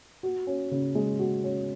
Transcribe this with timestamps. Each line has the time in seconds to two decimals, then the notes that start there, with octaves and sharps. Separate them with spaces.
0.23 F#4
0.47 C#4
0.71 C#3
0.95 G#3
1.19 F#4
1.44 C#4